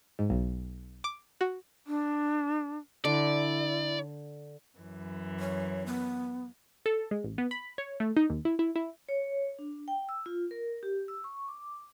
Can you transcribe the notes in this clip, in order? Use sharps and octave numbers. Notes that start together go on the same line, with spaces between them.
G#2
B1
D6
F#4
D4
D3 E4 D5
F#2 E3
C#5
B3
A4
G#3
A1
B3
B5
C#5
A3
D#4
D#2
E4
E4
E4
C#5
D4
G5
E6
F4
A#4
G4
E6
C#6
D6